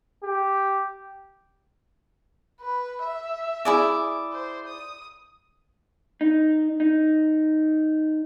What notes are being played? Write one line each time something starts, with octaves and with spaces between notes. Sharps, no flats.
G4
B4
E5
E4 G#4 D5
C5
D#6
D#4
D#4